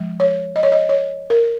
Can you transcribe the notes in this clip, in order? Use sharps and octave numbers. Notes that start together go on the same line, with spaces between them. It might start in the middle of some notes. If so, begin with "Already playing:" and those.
Already playing: F3 G#3
C#5
D#5
C#5
D#5
C#5
A#4